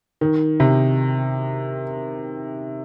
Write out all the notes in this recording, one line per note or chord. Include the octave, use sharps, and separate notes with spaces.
D#3
C3